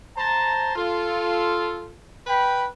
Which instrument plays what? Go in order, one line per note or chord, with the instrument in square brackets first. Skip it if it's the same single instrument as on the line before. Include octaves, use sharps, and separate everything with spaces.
[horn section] C5 A5 A#5
F4 A4
B4 G5 B5